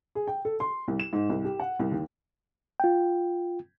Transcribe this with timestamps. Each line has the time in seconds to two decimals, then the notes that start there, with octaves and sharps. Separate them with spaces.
0.15 G#4
0.27 G5
0.45 A4
0.60 C6
0.88 C2
1.00 E7
1.13 G#2
1.29 C2
1.45 G4
1.60 F#5
1.79 C2
1.91 D#2
2.80 F4 G5